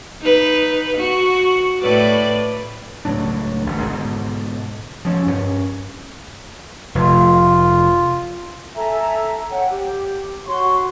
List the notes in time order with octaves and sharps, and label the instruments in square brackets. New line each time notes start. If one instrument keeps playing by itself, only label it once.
[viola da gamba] D#4 B4
F#4
A2 B4 D5
[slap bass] C#2 A2 F#3 D4
G#1 D2
G#2 B2 D3
F3 C#4
G2 A#3 C#4
[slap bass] F1 [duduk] F4
[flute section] A4 E5 G#5 A#5
C#5 F#5 G5
G4
F#4 C#5 C6 C#6